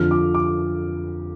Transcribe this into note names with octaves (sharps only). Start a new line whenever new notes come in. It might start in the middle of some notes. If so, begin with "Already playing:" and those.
Already playing: F2 D3 F3 F6
D6
D6